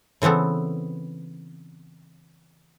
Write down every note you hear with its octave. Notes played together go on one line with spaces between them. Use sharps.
C#3 E3 B3 C4 A4